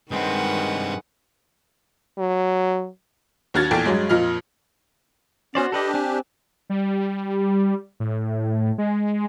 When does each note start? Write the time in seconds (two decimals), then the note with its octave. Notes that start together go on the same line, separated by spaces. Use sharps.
0.11 G2 D#3 G#3 C4 B4 F#5
2.18 F#3
3.54 D#2 D4 F#4 F6 G#6 A6
3.71 A#1 E2 A4 G5
3.85 G2 F#3 G#3
4.09 F2 A#2 D#5 F6
5.55 B3 C#4 F#4 C5 D5
5.72 D4 G4 A4 B4 D#5
5.94 C4 G#5 F#6
6.70 G3
8.00 A2
8.78 G#3